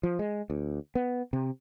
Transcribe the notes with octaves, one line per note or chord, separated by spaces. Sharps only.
F3
G#3
D2
B3
C3